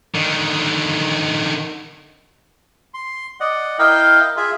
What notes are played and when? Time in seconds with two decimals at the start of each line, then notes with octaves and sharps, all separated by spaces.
0.15 D3 D#3
2.94 C6
3.40 D5 D#5 F#5
3.79 E4 A#4 D#5 F5 G5
4.37 F4 G#4 E5